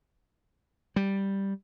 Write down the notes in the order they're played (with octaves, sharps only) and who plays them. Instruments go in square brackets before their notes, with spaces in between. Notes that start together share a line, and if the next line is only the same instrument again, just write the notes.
[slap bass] G3